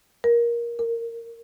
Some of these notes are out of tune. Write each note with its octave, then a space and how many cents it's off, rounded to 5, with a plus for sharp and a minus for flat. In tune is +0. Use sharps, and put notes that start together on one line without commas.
A#4 +15
A#4 -15